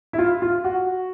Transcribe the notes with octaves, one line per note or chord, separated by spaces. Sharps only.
E4
F4
F4
F#4